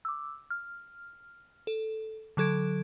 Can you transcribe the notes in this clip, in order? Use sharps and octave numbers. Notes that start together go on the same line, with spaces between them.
D6 E6
F6
A4
D3 F#3 A4 G#6 D7